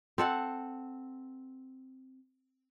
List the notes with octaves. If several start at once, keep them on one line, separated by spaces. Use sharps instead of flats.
C4 A4 F#5